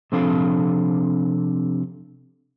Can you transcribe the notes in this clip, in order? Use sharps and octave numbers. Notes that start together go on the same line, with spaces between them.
C3 F3 C4 D4 A4 F5